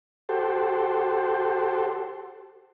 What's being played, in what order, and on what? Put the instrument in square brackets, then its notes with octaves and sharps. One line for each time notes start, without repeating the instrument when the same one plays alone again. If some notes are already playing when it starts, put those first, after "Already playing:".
[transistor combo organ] F#4 G4 A4 C5